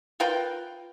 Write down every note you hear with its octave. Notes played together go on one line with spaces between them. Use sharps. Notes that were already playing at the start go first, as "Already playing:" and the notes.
F4 A#4 B4 G5